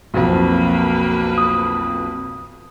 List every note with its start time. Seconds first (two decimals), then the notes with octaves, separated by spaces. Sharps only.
0.14 B1 F2 A#3 B4
1.38 D#6